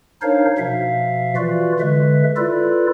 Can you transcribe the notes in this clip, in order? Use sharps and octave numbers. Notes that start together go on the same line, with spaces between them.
D4 D#4 A#4 C5 C#5 F5
B2 F3 E5 F5
E3 F4 F#4 B4 D5
D3 G#3 B4 E5
E4 F4 A4 B4 D5